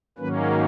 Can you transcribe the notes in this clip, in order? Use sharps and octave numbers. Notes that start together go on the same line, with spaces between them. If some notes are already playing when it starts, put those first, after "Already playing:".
G#2 D#3 F#3 A#3 C#4 B4